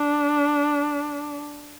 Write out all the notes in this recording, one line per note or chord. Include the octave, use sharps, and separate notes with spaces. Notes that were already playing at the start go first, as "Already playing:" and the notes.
Already playing: D4